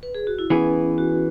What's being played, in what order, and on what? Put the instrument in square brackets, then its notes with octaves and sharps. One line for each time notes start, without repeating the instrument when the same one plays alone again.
[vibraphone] B4
G#4
F#4
E4
[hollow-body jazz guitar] E3 B3 G#4 [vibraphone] C#4
[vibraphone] F#4